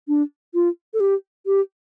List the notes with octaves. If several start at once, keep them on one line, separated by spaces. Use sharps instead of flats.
D4
F4
A4
G4
G4